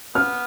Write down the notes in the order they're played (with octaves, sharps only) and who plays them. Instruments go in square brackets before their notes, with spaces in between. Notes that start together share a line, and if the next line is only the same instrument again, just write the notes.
[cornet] B3 [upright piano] F6